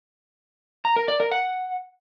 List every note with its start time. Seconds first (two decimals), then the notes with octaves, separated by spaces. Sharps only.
0.85 A#5
0.96 A#4
1.08 D5
1.20 A#4
1.31 F#5